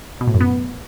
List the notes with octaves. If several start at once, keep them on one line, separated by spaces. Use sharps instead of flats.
B2
A2
F#2
B3